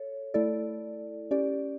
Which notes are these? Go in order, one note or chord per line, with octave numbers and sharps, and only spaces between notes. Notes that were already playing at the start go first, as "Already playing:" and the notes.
Already playing: A4 C#5
A3 E4 A4 D5
C#4 G4 D5